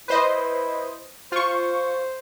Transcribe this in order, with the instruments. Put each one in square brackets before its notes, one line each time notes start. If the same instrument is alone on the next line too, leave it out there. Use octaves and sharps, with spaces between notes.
[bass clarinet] E4 [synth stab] B4 C5 D#5
[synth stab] F4 C#6 [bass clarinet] C5